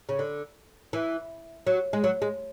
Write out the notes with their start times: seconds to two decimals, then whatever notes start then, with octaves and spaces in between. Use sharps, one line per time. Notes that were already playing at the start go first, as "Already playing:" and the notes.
0.09 C#3
0.19 D3
0.93 E3
1.67 F#3
1.93 G#3
2.04 F#3
2.22 G#3